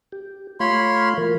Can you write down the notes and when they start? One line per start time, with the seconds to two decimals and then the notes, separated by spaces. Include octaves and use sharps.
0.12 G4
0.60 A3 F4 C#5 F5 B5 C6
1.18 E3 F4 A#4